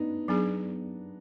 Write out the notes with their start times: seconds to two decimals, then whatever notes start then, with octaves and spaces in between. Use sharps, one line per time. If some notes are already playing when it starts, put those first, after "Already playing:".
Already playing: B3 D4 D#4
0.28 F#3 B3 D4 G#4